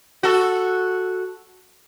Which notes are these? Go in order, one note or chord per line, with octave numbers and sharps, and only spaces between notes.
F#4 A4